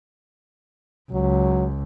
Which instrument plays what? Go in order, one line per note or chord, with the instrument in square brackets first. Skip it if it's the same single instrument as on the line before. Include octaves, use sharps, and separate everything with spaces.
[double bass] C#2 [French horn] F#3